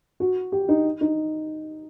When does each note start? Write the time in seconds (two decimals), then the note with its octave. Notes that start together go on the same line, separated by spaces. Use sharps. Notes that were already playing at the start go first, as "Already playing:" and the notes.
0.20 F#4
0.52 G4
0.69 D#4
1.01 D#4